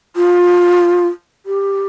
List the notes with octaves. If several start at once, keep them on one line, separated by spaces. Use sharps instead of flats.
F4
G4